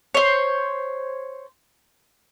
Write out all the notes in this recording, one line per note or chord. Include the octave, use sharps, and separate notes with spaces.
C5 C#5